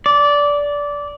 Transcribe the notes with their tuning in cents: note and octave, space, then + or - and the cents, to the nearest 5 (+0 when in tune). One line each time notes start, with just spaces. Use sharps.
D5 -15